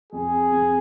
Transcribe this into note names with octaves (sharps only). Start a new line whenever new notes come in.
F2 G#4
F2